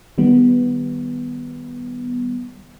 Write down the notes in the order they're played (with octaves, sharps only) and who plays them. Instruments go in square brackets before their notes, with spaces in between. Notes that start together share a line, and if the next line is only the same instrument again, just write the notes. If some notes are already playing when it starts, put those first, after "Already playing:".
[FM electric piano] D#3 G3 B3